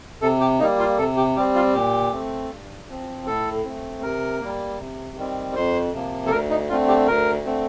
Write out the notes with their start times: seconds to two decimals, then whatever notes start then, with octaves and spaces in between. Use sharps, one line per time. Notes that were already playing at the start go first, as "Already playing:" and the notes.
0.22 C3 A4
0.40 G4
0.60 G3 A#3 D#4
0.79 F4
0.98 C3 A4
1.17 G4
1.36 G3 C4 G4
1.55 F4
1.74 A#2 G4
2.12 A3 C4
2.50 G2
2.89 F3 C4
3.26 A2 A4
3.64 A3 C4
4.03 C3 A#4
4.41 G3 A#3
4.79 C3
5.17 D#3 G3 C4
5.55 F2 C5
5.93 C3 F3 A#3
6.27 A4
6.31 D2 A#4
6.50 D#4
6.69 D3 A3 C4 F4
6.88 G4
7.08 D2 A#4
7.45 D3 A3 C4